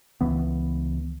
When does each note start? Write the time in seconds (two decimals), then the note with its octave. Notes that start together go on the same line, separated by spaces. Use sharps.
0.21 C#2 E3 B3